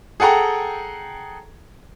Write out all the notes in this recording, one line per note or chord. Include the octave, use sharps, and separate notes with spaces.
G#4 A4 F#5 G5 A#5